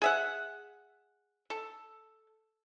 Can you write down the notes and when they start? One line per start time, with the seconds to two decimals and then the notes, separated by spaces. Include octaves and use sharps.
0.02 G#4 E5 F#5
1.50 A4